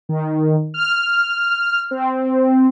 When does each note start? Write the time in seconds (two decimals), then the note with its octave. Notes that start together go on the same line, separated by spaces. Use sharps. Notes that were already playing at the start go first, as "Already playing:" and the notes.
0.09 D#3
0.74 F6
1.91 C4